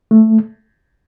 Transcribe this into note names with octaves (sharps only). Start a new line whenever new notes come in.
A3